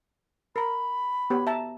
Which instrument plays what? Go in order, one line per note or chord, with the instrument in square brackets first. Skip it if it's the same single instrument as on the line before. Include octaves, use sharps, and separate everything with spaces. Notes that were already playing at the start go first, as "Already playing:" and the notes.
[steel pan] A#4 A#5 [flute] B5
[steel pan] B3 G4 C#5
E5 A5 A#5